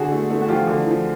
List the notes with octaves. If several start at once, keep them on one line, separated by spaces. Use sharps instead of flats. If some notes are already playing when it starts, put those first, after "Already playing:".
Already playing: D3 F#4 G#4
A3
A3
F#4
F3 F4 G4
D3
F3